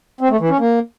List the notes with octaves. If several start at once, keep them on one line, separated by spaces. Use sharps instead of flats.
C4
A3
E3
C#4
A#3